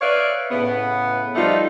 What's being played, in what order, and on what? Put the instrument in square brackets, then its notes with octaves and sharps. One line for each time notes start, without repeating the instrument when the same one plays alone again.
[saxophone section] B4 C#5 D5 E5 F5
A2 C#3 B3
F3 G3 A3 D#4 F4